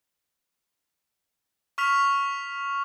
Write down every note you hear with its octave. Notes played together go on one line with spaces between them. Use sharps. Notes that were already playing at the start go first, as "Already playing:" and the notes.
C#6 F6 B6 F7